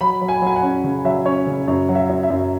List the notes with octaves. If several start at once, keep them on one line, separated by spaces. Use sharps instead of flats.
F#3 B5
F#3
G#5
F#3 G#5
F#5
C#4
C#3
F#3 E5
C#4 C#5
C#3
F#2 C#5
F#3
E5
F#2
E5
F#2